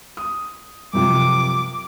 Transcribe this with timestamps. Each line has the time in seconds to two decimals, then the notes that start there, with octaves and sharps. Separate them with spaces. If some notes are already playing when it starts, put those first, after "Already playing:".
0.17 D#6
0.93 F#2 C3 F3 D6